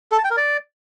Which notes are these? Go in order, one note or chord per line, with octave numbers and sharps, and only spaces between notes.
A4
A5
G5
A#4
D5